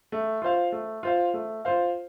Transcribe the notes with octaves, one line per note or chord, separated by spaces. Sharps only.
A3
F4 C5 F5
A3
F4 C5 F5
A3
F4 C5 F5